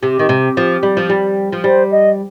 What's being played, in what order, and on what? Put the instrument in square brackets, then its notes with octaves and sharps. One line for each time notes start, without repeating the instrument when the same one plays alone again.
[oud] C3 [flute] G4
[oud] D#3
C3
F3
G3
F3
G3
F3
[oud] G3 [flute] C5
[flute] D#5